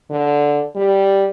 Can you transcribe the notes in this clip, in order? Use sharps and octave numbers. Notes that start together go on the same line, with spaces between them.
D3
G3